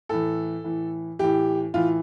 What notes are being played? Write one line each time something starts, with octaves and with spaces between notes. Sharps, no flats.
A2 E3 A4
A2 E3
A2 E3 G4
A2 E3 F4